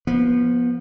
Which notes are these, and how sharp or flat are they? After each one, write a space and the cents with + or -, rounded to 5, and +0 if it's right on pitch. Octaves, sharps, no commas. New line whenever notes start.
F3 +0 B3 -25